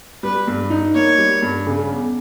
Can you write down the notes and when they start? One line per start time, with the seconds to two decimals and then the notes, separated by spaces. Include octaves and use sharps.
0.23 G3 B4
0.47 G2
0.70 D#4
0.94 A#3 C#5
1.18 G3
1.42 G2
1.66 C#3
1.91 E2